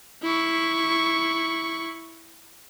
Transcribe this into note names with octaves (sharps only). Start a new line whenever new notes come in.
E4 C#6